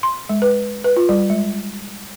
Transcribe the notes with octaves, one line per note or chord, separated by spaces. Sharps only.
C6
G#3
B4
B4
F4
G3
G#3